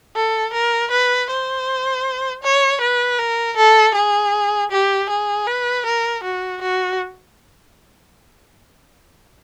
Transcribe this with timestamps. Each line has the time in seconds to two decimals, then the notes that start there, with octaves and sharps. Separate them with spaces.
0.16 A4
0.53 A#4
0.91 B4
1.30 C5
2.43 C#5
2.81 B4
3.19 A#4
3.57 A4
3.95 G#4
4.72 G4
5.10 G#4
5.47 B4
5.86 A#4
6.24 F#4
6.61 F#4